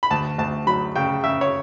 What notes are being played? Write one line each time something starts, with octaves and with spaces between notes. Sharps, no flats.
B5
D2 A5
D2 A5
F#3 B5
C#3 G5
C#3 E5
C#5